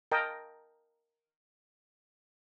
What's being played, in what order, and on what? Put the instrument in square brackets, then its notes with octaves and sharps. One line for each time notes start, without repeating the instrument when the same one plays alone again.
[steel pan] A#4 D#5 G5 A5